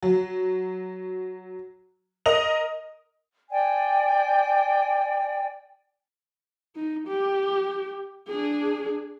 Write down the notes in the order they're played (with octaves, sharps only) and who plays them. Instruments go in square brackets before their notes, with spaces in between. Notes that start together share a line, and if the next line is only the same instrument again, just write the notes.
[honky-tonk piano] F#3
A#4 D#5 D#6 F7
[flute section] D5 G5 G#5
[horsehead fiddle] D#4
G4
D4 G#4